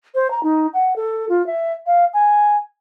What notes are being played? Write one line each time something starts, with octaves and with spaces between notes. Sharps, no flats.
C5
A#5
D#4
F#5
A4
F4
E5
F5
G#5